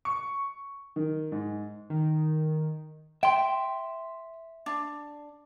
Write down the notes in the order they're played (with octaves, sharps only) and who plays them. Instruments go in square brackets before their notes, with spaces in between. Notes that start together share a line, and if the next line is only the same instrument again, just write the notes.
[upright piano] C#6
[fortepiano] D#3
G#2
[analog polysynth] D#3
[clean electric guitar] E5 C6 [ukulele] G5
[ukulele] D4